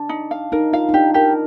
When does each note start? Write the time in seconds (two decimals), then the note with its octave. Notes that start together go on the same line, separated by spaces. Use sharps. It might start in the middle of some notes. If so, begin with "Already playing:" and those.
Already playing: D4
0.09 D#4
0.31 F5
0.52 D#4 A#4
0.73 F4 F5
0.89 D#4
0.94 D4 G4
1.14 G4 A#4